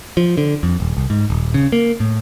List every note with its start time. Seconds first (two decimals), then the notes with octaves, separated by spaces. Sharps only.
0.17 F3
0.38 D3
0.63 F2
0.80 D#1
0.97 C2
1.10 G#2
1.30 D#1
1.54 C#3
1.72 A#3
2.00 A2